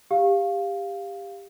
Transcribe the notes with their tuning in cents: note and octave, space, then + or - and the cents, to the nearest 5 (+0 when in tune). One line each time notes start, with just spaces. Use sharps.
G4 +20 F5 +0